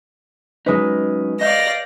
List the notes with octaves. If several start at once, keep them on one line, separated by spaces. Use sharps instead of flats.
F#3 G#3 C#4 D#4 B4
D5 D#5 F5 G6 A#6